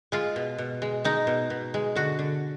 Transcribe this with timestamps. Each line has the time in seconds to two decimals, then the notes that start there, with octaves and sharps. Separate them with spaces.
0.12 G#3 F4
0.36 B2
0.58 B2
0.82 G#3
1.04 G#3 D#4
1.27 B2
1.50 B2
1.74 G#3
1.96 D3 F#4
2.19 D3